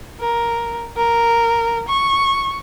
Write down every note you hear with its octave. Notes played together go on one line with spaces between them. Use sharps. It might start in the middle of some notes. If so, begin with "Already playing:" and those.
A#4
A#4
C#6